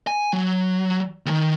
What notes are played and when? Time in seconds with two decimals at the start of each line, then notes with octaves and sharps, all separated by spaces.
0.07 G#5
0.33 F#3
1.26 D#2 D#3